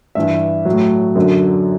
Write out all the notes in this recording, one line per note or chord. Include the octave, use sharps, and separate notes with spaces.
G2 E3 E5
F#3
A2
F#2 D3 F#3